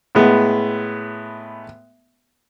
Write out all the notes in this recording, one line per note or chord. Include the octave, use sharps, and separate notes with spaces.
A2 G#3 B3